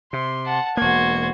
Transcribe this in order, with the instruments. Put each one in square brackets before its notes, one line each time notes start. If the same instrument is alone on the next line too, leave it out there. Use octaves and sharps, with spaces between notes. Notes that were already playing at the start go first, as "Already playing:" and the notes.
[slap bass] C3 [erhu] C6
[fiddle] F#5 A5
[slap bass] E1 A#3 [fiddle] F#4 C5 [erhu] G#6